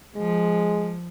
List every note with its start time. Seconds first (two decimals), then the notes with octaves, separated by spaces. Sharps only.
0.16 F3 G#3